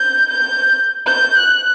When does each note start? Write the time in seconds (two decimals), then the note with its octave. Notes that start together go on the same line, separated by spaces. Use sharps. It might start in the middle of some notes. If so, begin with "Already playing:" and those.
Already playing: G6
0.30 G6
1.07 G6
1.37 F#6